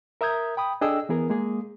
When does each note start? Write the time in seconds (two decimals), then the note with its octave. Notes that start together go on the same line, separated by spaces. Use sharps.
0.21 A#4 E5 A#5 D#6 G6 G#6
0.57 G5 B5 D#6
0.81 D4 G#4 A4 D#5 G5 E6
1.09 E3 B3 G#4 A#4
1.30 G#3 A#3 G#4